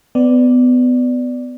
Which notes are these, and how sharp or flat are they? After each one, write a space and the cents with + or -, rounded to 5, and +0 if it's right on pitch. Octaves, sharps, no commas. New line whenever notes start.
B3 +25 D5 +0